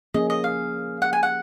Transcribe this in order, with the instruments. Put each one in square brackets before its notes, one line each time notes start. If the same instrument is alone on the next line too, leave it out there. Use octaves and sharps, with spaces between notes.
[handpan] F3 A#3 C#4 G#4 [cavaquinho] D#5
[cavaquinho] D#5
F5
F#5
G#5
F#5